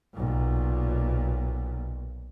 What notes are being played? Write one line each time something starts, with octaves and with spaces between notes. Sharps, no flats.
B1 A#2